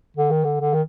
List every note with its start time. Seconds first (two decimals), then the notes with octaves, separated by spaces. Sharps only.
0.17 D3
0.31 D#3
0.44 D3
0.61 D3
0.74 D#3